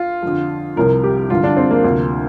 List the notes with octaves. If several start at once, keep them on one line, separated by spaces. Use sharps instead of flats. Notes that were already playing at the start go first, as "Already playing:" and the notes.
Already playing: F4
F2 D3 F3
C2 C3 F3 A#4
G4
G2 D3 F3 F4
D4
C4
A#3
D2 C3 F3